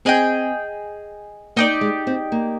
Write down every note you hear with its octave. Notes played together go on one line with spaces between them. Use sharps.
C4 G#4 D#5 G5
A#3 D#4 G4 D5
G#3
C4
A#3